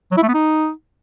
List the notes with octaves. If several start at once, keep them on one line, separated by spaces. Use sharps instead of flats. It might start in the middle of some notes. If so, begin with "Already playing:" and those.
F#3
E4
A3
B3
D#4